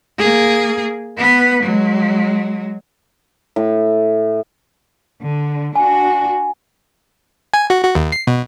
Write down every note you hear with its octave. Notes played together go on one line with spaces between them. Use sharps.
A#3 G#4
B3 B4
F#3 G#3
A2
D3
D4 F#4 G#5
G#5
F#4
F#4
D#2
C7
B2